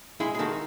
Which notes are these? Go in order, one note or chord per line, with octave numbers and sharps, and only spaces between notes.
G#3 E4 G#4
G#4
D#3 F#4 A4